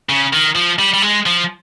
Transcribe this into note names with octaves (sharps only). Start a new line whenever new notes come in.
C#3
D#3
F3
G3
G3
G#3
F3